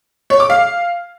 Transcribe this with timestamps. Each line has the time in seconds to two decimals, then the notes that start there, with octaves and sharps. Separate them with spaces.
0.30 C#5
0.40 D6
0.50 F5